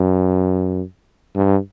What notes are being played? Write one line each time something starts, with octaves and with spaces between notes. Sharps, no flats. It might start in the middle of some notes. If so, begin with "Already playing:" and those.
Already playing: F#2
G2